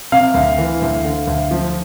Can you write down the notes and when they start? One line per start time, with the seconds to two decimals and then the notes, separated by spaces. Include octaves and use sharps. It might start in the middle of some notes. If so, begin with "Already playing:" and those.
0.12 C3 F5
0.34 D2
0.58 E3
0.82 D2
1.05 D3
1.27 D2
1.51 F3